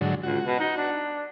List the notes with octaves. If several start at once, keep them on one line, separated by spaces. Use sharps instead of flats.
G#2 D3 F#3
C#2 F#4
B2
D#4
D4